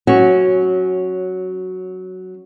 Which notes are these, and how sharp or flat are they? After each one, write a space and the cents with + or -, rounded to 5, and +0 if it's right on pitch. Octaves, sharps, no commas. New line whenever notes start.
F#3 +0 C#4 -10 F#4 +0